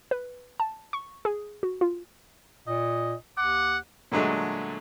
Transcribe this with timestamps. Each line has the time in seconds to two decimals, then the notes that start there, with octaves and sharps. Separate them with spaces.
0.11 B4
0.60 A5
0.93 C#6
1.25 G#4
1.63 F#4
1.81 F4
2.68 A#2 D#5
3.37 D#2 F#5 D6
4.12 A#2 D3 F#3 G#3 A3